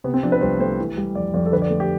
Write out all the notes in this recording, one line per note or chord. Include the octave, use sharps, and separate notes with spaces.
C3 B3
C4
F3 D4
B4
C2 C5
A3 C5
E3
G3
F2 D5
F2 D5
A4
D3 B4
D5
A3
G4